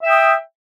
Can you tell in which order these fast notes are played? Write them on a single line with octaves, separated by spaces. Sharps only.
E5 G5 D#6